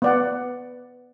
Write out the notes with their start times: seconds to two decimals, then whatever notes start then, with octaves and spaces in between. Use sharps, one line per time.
0.02 B3 D5 F#5